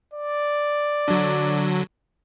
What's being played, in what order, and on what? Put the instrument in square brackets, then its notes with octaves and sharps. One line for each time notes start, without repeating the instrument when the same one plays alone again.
[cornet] D5
[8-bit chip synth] D3 F#3